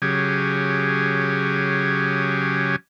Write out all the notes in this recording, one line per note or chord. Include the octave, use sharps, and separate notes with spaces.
C#3 F#3 G4 G#4